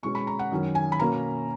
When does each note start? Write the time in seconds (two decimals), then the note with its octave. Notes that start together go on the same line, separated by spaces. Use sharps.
0.03 B2 G#3 C#4 C#6
0.15 B5
0.27 A#5
0.39 F#5
0.51 F#2 D#3 F#3 C#4
0.75 G#5
0.92 B5
0.99 B2 A#3 C#4 A#5